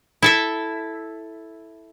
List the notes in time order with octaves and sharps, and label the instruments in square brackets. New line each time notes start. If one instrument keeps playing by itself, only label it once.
[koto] E4 A4 E5